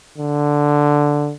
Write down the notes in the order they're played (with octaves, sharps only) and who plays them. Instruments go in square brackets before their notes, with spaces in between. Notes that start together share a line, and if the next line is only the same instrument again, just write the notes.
[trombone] D3